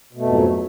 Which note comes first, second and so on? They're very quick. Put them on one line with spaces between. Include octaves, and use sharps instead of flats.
B2 A3 F2 G#2 F#3